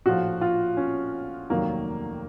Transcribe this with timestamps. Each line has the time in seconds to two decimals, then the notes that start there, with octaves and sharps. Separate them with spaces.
0.06 A#1 A2 F3 F#4
0.41 F4
0.77 C#4
1.50 F1 D#2 D#3 F#3 A#3